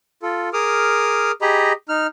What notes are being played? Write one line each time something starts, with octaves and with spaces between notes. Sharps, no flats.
F4 A4
G#4 A#4 D6 D#6 F6
G4 G#4 D#5 A#5 B5
D#4 F6